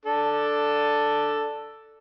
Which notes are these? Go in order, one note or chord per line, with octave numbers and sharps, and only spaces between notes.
D4 A4